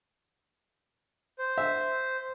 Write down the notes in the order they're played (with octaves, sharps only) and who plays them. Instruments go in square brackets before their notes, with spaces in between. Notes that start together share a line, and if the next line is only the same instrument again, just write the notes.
[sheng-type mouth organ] C5
[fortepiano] E5